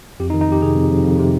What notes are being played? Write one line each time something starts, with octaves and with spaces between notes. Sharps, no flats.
F2 G4
D#4
D#3
D#4
F2 G4
C3 G#4
F2
F2
F2
C3